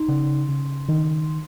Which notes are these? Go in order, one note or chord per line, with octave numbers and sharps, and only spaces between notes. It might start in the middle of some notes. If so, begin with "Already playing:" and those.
Already playing: D#4 C6
C#3
C#3
D#3